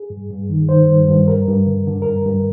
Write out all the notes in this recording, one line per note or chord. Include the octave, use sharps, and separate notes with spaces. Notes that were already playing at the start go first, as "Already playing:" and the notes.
Already playing: G#4
G2
G2
D#3
D#3 C5
G2
G2
G2 A#4
G2
D3
D3
G2 A#4
G2